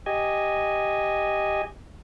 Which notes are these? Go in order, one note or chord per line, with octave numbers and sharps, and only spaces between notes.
G4 D#5 G#5